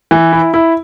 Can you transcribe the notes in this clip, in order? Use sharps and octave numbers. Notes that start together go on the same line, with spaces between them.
E3
E4
E4